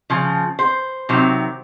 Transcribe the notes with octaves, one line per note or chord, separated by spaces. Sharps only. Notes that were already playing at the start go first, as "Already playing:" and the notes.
C#3 F3
C5
C3 D#3 F#3